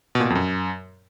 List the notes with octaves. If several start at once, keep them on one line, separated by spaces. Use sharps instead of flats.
B2
A#2
B2
F2
F#2